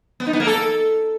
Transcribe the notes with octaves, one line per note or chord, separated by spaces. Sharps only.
B3
D#4
B3
A#3
A4